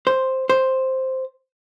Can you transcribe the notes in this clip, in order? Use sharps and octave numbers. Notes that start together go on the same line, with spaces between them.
C5
C5